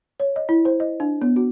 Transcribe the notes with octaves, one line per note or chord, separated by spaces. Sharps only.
C#5
D#5
E4
C5
D#5
D4
B3
F#4